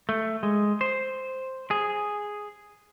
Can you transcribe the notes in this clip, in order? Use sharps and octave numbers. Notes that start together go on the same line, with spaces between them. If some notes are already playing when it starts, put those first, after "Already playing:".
A3
G#3
C5
G#4